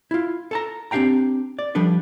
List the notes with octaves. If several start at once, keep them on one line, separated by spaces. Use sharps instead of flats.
E4 F4
A4 A5 A#5
C4 D4 G4 F5 G5 A#5
D5
F3 G3 D4 A4 B4